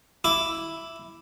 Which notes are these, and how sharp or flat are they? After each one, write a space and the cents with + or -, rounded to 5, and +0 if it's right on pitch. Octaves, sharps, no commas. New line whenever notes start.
E4 +0 D6 -5